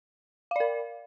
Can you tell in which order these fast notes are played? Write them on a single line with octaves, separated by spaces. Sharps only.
F5 D5 A#4